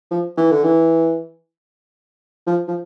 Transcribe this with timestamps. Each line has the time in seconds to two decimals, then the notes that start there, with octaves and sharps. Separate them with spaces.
0.11 F3
0.37 E3
0.51 D3
0.64 E3
2.47 F3
2.68 F3